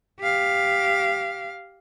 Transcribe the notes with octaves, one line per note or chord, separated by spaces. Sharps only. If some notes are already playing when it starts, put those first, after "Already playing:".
G4 F5